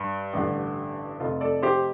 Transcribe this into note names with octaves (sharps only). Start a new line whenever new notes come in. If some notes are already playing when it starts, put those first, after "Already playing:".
Already playing: G2
A1 G2 D3
F1 F2 C3 F4 A4
A4 D5
G4 C5